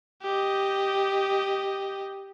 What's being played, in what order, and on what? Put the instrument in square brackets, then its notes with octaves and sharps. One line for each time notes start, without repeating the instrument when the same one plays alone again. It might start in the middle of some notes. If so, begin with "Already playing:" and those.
[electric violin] G4 D#5